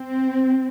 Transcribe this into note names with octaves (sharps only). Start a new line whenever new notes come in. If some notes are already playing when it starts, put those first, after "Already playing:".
Already playing: C4